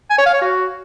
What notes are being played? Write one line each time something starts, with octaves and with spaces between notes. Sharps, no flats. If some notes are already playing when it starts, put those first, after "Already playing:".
G#5
C#5
F5
C#5
F#4